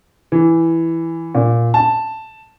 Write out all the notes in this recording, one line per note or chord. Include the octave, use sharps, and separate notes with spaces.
E3
A#2
A5